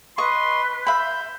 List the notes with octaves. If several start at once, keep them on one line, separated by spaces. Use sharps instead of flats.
B4 D#5 C6 C#6
E5 B5 G6